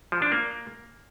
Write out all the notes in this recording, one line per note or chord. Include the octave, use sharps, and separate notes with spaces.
F3
D4
A#3